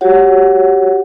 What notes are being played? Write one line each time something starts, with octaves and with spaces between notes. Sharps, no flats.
F#4 G4 C#5 F#5